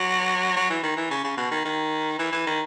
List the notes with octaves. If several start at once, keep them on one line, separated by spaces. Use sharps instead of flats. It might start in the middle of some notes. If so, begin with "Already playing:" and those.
Already playing: F#3
F#3
E3
D#3
E3
C#3
C#3
B2
D#3
D#3
E3
E3
D#3